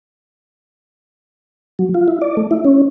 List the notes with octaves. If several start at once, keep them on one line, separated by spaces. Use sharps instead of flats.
F#3
F4
E4
D5
A3
E4
C#4